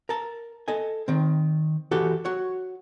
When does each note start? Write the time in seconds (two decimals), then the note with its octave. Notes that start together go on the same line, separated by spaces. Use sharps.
0.09 A#4 A5
0.68 A4 D#5 G#5
1.08 D#3 C4
1.91 E3 F#4 G4 A4
2.25 F#4 C#5